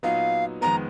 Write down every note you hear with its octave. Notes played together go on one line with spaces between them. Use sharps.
A#2 F#3 B3 D#4 F5
F2 D#3 G#3 B3 A#5